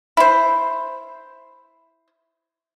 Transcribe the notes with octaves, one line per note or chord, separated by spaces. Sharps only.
E4 C5